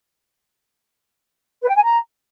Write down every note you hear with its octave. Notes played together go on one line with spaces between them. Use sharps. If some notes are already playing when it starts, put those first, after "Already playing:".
B4
G5
G#5
A#5